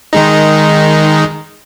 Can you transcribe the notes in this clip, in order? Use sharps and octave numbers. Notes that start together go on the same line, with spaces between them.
D#3 G#3 D#4